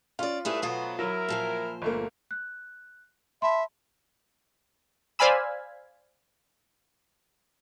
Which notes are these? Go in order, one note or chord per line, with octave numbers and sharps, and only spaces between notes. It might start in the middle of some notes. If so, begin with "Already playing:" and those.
C#4 F4 D5
G#2 G3 A3 E4 G#4 B4
B2 F#3 B3 F4 C5 D#6
F#3 E4 A#4
A#2 F3 C5
G1 A3 A#3
F#6
E5 A5 B5 C6
C5 D5 F5 G#5 B5 E6